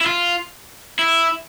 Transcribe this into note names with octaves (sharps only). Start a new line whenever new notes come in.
E4
F4
E4